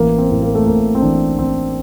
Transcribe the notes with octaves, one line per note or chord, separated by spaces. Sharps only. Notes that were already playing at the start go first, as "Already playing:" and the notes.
Already playing: A1 A#3
C4
A2
A#3
A3
A2 A#3
C4
A1 D4
A1 C4